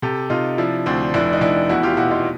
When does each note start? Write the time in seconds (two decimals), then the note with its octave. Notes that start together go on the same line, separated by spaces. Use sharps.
0.02 C3 G4 A4
0.30 C3 D#4 F4
0.58 F3 D4 E4
0.86 D2 C4 D4
1.14 F1 D4 E4
1.33 D#4
1.41 F1 D4 E4
1.69 E2 E4 F#4
1.83 F4 G4
1.97 B2 E4 F#4
2.11 D#4 F4